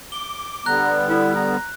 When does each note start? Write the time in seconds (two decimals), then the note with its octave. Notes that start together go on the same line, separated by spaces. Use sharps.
0.12 D6 G7
0.66 D3 G3 B3 A#5 F#6
1.09 E4
1.36 A#5